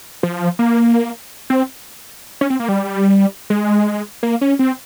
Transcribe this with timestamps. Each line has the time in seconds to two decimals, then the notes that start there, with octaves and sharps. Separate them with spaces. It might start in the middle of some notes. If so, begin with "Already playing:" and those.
0.23 F3
0.59 A#3
1.50 C4
2.41 C#4
2.50 C4
2.60 A#3
2.69 G3
3.50 G#3
4.23 A#3
4.41 C#4
4.59 C4